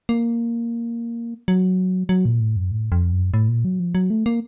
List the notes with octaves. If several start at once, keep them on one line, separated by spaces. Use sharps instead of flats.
A#3
F#3
F#3
A#2
A2
F#2
A2
F2
F#2
A2
A#2
F#3
F3
F#3
A3
A#3